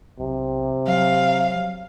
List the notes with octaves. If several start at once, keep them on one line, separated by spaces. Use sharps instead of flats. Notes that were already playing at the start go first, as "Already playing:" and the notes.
B1 C3
F#3 F5